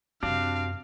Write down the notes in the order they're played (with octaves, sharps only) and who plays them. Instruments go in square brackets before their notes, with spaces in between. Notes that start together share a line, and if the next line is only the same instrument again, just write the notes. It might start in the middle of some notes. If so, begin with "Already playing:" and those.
[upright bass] F#2 C3 [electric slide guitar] C4 F#4 G4 [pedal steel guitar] D4 [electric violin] F5